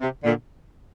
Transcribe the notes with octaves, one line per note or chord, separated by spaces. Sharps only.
C3
A#2 D3